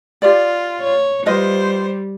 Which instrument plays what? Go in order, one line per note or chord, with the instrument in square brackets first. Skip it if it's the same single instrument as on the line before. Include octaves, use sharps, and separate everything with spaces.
[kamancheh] F4 [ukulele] G4 D5
[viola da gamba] C#5
[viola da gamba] G3 [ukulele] F4 B4 D#5 [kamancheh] C5